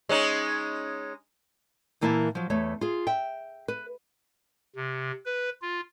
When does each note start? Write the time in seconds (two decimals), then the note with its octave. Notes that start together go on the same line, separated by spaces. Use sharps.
0.09 G#3 C#4 D#4
2.01 A#2 E3 A#3 E4 C#5 A5
2.35 F3 F#3
2.50 E2 A3 C#5
2.81 F4 G#4
3.07 E5 G5
3.68 B4
4.76 C3
5.26 B4
5.62 F4